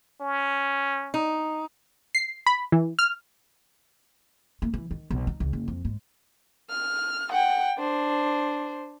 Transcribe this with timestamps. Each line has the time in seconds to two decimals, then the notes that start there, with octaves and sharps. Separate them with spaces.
0.21 C#4
1.14 D#4
2.15 C7
2.46 B5
2.72 E3
2.99 F6
4.62 A#3
4.74 E3
4.91 D#3
5.10 B1
5.27 D#4
5.40 C#2
5.53 F#1
5.68 F2
5.85 G#2
6.70 F6
7.31 F#5 G5
7.78 D4 C5